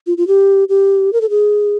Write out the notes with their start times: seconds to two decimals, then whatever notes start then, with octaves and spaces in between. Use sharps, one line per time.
0.07 F4
0.17 F4
0.27 G4
0.69 G4
1.13 A#4
1.21 A4
1.30 G#4